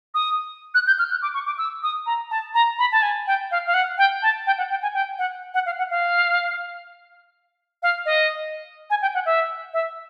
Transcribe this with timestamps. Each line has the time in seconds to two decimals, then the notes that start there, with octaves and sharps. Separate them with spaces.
0.14 D#6
0.75 F#6
0.87 G6
0.99 F6
1.11 F#6
1.22 D6
1.34 C#6
1.46 D6
1.58 E6
1.83 D#6
2.06 A#5
2.31 A5
2.54 A#5
2.79 B5
2.92 A5
3.02 G#5
3.27 G5
3.51 F5
3.66 F5
3.74 F#5
3.98 G5
4.22 A5
4.47 G5
4.58 F#5
4.70 G5
4.82 G#5
4.94 G5
5.19 F#5
5.54 F#5
5.66 F5
5.78 F#5
5.90 F5
7.83 F5
8.06 D#5
8.90 G#5
9.02 G5
9.14 F#5
9.26 E5
9.74 E5